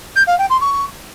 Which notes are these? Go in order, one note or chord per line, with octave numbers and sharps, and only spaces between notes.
G6
F5
G5
C6
C#6